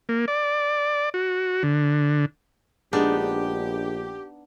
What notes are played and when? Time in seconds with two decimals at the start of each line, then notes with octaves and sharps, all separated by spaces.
0.09 A#3
0.28 D5
1.14 F#4
1.63 D3
2.93 A#1 G#3 B3 D4 D#4 G4